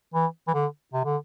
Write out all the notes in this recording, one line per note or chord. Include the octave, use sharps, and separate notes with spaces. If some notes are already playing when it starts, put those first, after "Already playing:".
E3
E3
D3
C3
D3